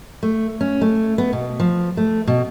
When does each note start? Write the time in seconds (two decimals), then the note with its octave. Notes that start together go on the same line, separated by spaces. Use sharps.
0.23 A3
0.61 C#4
0.81 A3
1.18 B3
1.33 B2
1.60 F3
1.97 A3
2.27 B2